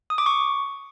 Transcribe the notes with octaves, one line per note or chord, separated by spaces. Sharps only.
D#6
D6
C#6